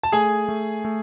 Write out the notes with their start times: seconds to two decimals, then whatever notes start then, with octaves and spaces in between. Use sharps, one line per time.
0.03 A5
0.12 A3 G#4 G#5
0.48 A3
0.85 A3